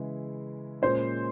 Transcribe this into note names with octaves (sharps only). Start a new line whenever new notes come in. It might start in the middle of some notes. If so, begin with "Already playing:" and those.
Already playing: C#3 E3 G#3 E4
A#2 G#3 C#4 C5